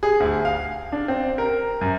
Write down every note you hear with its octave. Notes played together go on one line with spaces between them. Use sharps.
G#4
D2
F5
D4
C4
A#4
F#2